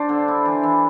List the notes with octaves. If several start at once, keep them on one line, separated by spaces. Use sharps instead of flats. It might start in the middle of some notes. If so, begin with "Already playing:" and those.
Already playing: G3 D4 C5 D5
D3
E4
E3
E3